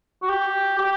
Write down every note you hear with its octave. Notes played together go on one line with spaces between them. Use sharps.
F#4
G4
G4